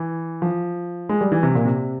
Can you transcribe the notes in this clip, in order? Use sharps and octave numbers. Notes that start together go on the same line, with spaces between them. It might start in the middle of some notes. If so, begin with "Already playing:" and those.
Already playing: E3
F3
G#3
G3
E3
C3
A#2
C3